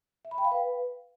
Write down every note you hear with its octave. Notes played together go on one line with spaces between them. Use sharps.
E5
B5
G5
F5
B4